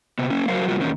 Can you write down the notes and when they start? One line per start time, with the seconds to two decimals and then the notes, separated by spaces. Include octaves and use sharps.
0.19 C3 B3
0.30 A#3 C#4
0.48 F#3 F#4 A#4 C5 F5
0.68 C3 G3 A#3 F4 F#4
0.80 E2 D#3 A#3 B3 C#4 D#4